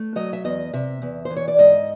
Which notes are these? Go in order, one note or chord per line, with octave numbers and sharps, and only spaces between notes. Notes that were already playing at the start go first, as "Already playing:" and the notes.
Already playing: A3
F#3 D#5
E5
E2 D#5
C3 E5
E2
C5
E3
C#5
D5
G#2 D#5